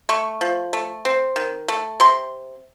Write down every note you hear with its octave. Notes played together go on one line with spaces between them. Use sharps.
A3 C#6
F3
A3
C4
D#3
A3
C3 C6